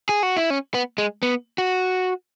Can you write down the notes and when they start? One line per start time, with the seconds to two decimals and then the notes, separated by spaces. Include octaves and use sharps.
0.09 G#4
0.23 F#4
0.37 E4
0.50 C#4
0.74 B3
0.98 G#3
1.23 B3
1.58 F#4